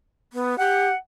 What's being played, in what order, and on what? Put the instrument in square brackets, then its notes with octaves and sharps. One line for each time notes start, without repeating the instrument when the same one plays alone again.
[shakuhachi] B3
[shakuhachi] G4 [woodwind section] F#5